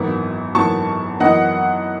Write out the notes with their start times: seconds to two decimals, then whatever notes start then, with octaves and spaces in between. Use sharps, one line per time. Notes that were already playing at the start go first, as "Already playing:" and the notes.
Already playing: G#1 F#2 E3 B3 E4
0.55 G#1 F#2 E3 B3 E4 A5 C#6
1.20 F#2 E3 B3 E4 D#5 F#5